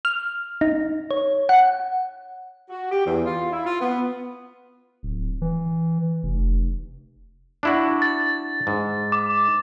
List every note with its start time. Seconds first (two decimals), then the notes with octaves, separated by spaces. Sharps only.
0.05 F6
0.61 D#4
1.11 C#5
1.49 F#5
2.70 F#4
2.90 G4
3.05 E2
3.25 F4
3.52 E4
3.65 F4
3.80 B3
5.03 D1
5.42 E3
6.23 F1
7.63 D4 E4 F#4
8.02 A6
8.67 G#2
9.12 D6